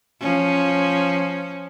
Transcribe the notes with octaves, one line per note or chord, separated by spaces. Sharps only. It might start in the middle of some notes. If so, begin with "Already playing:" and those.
F3 C#4